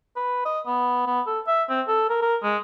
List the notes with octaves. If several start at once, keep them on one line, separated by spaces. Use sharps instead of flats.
B4
D#5
B3
B3
A4
E5
C4
A4
A#4
A#4
G#3